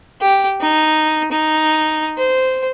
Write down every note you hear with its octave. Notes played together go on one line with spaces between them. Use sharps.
G4
D#4
D#4
C5